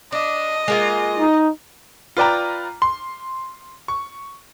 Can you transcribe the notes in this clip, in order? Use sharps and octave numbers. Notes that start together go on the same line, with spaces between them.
D4 D#5
G#3 A#3 F4
D#4
F4 B4 D5 G5 A#5
C6
C#6